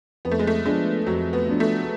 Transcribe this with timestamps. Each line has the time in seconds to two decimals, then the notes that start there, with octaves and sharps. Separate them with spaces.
0.25 F2 B3
0.31 A3
0.39 G#3
0.47 A3
0.66 F3 G#3 B3 D4
1.06 F2 F#3
1.33 B3
1.47 F3 B3 D4
1.60 A3